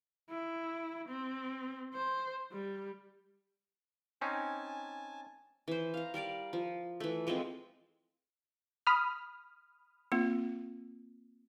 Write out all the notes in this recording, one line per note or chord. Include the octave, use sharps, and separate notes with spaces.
E4
C4
C5
G3
C4 C#4 D#4 G#5 A5
E3 C5
F5 A#5
G3 A#4 D5 F5
F3
E3 A3
F3 G#3 A3 C4
B5 D#6 F6
A#3 C4 F4